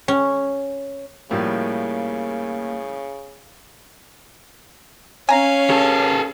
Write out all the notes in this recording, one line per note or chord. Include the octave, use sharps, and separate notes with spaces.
C#4
A2 C#3 F3 G3 A#3
C#4 C#5 F5 G#5 A#5
G#4 A4